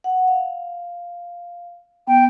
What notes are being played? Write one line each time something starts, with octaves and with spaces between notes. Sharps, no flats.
F#5
F5
B3 G5